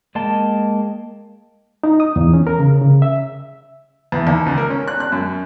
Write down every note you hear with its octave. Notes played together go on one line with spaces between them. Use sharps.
G#3 A#3 D#5 G5 A5
D#4
D#6
E2
C#4
A#4
C#3
C#3
E5
E2
D#2
C#2
A#4
C#4
F#6
F#6
F#2